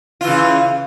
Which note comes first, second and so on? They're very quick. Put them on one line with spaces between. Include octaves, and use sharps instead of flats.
F4 E3 C#3